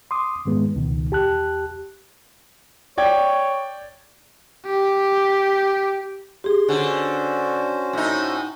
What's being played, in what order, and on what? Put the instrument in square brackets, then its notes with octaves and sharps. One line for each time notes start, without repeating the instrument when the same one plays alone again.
[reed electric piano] C6 D6 D#6
G#2 D#3 G#3 B3
C#2 B2 D#3
E2 G4 A5 F#6
[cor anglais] C#5 [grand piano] D5 G5 G#6
[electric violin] G4
[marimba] G4 G#4 [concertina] C6
[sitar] D3 [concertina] C#4 F#4 C5
[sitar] A2 D#4